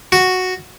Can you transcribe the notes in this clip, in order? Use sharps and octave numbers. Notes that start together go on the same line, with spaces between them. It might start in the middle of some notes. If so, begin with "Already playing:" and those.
F#4